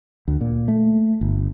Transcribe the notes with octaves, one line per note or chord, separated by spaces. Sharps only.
D2
A#2
A3
G1